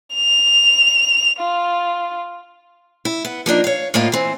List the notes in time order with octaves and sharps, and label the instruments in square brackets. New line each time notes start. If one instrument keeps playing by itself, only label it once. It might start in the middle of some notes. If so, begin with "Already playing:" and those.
[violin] F7
F4
[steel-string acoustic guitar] E4
B3
F3 A#3 D4 D#4
C#5 F5
A2 A#3 D#4 F4
E3 C4